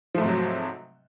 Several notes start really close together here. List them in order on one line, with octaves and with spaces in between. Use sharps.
F3 A3 G#2 C3 F#3